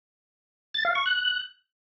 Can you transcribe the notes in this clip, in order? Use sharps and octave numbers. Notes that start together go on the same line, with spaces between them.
A6
F5
C#6
F#6